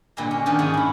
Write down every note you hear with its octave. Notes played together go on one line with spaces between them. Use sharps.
A#2 D3 G3 G#3
C#4
D3 D#3 F3 C#4 D4
G#2 C#4 G#4 F#5 G#5
A2 E4